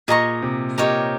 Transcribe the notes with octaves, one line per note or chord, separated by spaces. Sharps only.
A#2 G#4 D#5 A#5 C#6
C3
A#2 D#4 G4 A#4 C#5